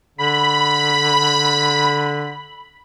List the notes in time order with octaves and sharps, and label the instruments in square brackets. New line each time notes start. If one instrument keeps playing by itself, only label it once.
[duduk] D3 [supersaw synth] B5